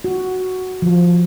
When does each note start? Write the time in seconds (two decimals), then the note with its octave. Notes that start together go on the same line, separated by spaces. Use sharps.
0.04 F#4
0.82 F3